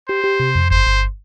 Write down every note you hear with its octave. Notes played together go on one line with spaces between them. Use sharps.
G4 C5
G4
C3
F2
G1 C5
G1